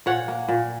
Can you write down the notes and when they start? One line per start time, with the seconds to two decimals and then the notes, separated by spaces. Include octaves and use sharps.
0.06 A#2 C#5 F#5
0.28 A#3
0.48 A#2